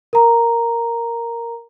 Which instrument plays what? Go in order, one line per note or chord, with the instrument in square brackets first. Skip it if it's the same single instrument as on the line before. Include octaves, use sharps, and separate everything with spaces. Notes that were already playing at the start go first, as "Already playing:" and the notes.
[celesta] A#4 A#5